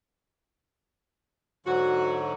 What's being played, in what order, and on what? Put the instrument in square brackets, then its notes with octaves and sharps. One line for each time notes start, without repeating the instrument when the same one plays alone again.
[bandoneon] G#2 D3 F#3 [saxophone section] F#4